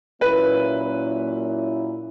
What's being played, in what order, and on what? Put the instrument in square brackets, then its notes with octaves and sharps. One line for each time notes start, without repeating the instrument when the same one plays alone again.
[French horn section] A#2 F#3 A#3 C#4 E4 [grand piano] B4